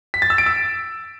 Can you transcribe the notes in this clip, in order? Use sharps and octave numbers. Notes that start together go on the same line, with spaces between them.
B6
A6
E6
D7
E6